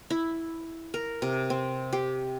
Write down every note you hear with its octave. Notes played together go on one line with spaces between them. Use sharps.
E4
A#4
C3
C4
G4